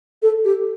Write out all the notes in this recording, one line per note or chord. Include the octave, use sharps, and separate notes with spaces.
A4
G4